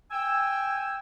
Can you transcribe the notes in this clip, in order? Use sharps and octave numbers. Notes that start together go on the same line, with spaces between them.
G5 G#5 E6